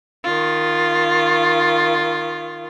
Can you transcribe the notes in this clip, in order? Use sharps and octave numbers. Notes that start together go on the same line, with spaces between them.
D#3 F4